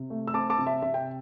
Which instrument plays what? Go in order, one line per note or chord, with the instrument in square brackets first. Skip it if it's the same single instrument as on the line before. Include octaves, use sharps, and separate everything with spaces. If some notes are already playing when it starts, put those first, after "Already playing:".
Already playing: [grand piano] C3
A3
E6
C4 A5 D6
A5 D6
C3
E5 A5
C3 E5
G5